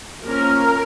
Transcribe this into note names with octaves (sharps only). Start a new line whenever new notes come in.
F3 A#3 C#4 A#4